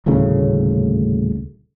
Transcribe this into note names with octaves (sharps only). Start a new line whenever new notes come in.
D#1 D2 A2 C#3